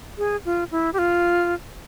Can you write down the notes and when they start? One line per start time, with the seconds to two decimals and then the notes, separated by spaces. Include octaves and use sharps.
0.18 G#4
0.45 F4
0.71 E4
0.93 G4
0.98 F4